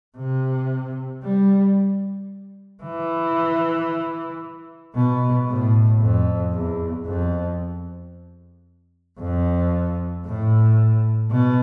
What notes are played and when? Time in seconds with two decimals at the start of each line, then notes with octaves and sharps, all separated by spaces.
0.17 C3
1.23 G3
2.83 E3
4.95 B2
5.48 A2
6.01 F2
6.54 E2
7.06 F2
9.19 F2
10.26 A2
11.30 B2